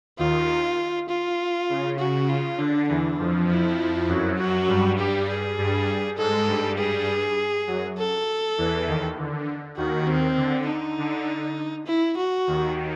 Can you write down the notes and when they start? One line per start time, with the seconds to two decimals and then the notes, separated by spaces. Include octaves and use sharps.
0.18 D#2 D#3 F4
1.09 F4
1.69 C#3
1.99 F#4
2.28 C#3 F4
2.58 D3 D4
2.88 E2 E3 D4
3.19 F2 F3
3.48 F2 F3 E4
4.08 F#2 F#3
4.38 F#4
4.68 G2 G3
4.98 G4
5.29 G#4
5.58 G2 G3
6.18 G#2 G#3 A4
6.48 G2 G3
6.78 G#4
7.67 F#2 F#3
7.98 A4
8.58 E2 E3
8.87 D#2 D#3
9.18 D3
9.77 D#2 D#3 F#4
10.07 D#2 D#3 C4
10.37 D3
10.67 D#4
10.98 D3
11.87 E4
12.17 F#4
12.47 D#2 D#3